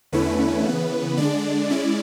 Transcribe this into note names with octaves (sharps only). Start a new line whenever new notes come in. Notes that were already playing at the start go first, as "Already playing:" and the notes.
E2 D3 A3 C#4 E4 B4
C#3 E3 B3
D3 G#3 D4 D5
G#3 C#4 E4 D5